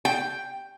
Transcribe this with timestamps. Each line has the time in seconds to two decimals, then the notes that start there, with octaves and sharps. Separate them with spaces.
0.05 G5